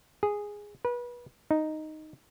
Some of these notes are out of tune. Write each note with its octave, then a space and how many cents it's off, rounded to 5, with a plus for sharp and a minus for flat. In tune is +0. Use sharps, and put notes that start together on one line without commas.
G#4 -5
B4 -30
D#4 -5